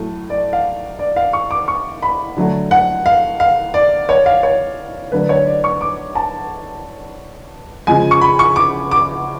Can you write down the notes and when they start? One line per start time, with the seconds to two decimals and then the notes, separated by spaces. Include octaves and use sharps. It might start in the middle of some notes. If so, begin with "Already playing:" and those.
Already playing: A2 F#3 A3
0.30 D5
0.53 F5
0.99 D5
1.16 F5
1.33 C#6
1.51 D6
1.68 C#6
2.02 B5
2.37 D3 F#3 A3
2.71 F#5
3.06 F5
3.40 F5
3.74 D5
4.09 C#5
4.26 F5
4.43 C#5
5.12 D3 F#3 A3 B4
5.29 C#5
5.47 D5
5.64 C#6
5.81 D6
6.15 A5
7.87 C#3 F3 G#3 G#5
8.11 C#6
8.21 B5
8.39 C#6
8.56 D6
8.91 D6